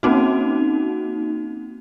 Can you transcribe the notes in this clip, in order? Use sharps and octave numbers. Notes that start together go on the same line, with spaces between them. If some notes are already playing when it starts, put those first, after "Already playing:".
A#3 C4 C#4 D#4 F#4